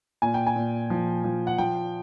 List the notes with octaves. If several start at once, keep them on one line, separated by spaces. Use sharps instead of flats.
A#2 G#5
G5
G#5
A#2
F3
F3
F#5
F3 G5